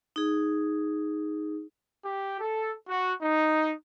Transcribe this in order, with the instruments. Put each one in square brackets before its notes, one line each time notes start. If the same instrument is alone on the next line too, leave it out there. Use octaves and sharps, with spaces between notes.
[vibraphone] D#4 G#4
[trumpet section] G4
A4
F#4
D#4